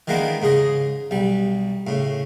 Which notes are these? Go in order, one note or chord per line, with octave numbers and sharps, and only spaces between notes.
D#3 E3 G#3 A#3 B3 D4
G#2 C#3 G#4 D#5
B1 G3
A2 C#3